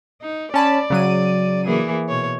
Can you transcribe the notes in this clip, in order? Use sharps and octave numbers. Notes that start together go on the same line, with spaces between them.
D#4
C#4 D5 A5 B5
C#3 F#3 D#7
E3 A#3 G#4
B2 C#5